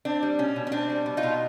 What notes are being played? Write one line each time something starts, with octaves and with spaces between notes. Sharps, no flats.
C4 D4
G3
B2 C#4
B2
C#4
C4 D4
G3
B2
D#4 F4
B2